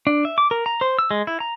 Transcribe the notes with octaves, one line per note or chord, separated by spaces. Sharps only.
D4
E5
D6
A#4
A#5
C5
E6
G#3
E4
A#5